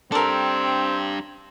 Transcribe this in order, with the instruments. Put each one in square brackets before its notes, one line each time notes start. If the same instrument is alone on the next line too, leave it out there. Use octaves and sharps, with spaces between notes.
[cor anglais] C4 [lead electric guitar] D4 G4 [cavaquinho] A4 A#4